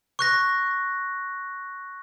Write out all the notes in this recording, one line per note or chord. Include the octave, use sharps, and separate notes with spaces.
C#6 F#6 A#6